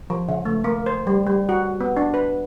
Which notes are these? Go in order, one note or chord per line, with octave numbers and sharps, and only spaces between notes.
F3
C#3
A3
A#3
C5
G3
G3
F#4
B3
D4
B4